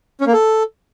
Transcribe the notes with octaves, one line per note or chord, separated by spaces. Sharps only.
C#4
A#3
A4